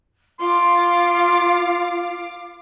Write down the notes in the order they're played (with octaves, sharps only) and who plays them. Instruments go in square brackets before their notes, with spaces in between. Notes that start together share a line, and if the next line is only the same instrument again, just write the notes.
[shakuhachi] F4 [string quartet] F5 D6 [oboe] C6